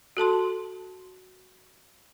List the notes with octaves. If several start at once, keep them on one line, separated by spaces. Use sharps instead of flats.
F#4 A4 A5 C6